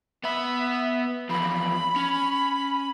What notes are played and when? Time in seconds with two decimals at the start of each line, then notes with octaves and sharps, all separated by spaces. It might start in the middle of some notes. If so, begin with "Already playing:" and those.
0.24 B3 E5 B5
1.29 E2 F3 B5
1.96 C#4